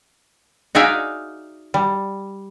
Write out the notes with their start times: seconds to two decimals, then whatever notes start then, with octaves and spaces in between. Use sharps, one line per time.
0.75 D#4 F#4 G#4 D5 E5 F5
1.74 G3